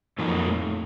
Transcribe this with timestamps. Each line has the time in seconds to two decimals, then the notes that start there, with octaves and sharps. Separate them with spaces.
0.18 F2 A#2 F#3 A#3 D#4 A#4
0.47 A2